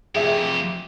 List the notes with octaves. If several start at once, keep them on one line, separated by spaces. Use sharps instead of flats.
F2 G4 G#4 E5